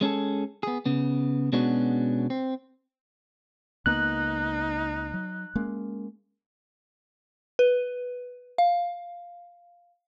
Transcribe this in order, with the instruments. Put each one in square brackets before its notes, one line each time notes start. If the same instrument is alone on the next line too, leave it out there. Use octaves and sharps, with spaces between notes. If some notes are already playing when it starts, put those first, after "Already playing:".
[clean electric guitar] G#3 C#4 G#4 A4
B3 G#4
C#3 B3
B2 G#3 B3 C#4 D4 F#4
C4
[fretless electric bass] C#2 A#3 B3 [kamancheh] D#4 [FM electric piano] F#6
[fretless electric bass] F#3
G#3 A#3 C#4
[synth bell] B4
F5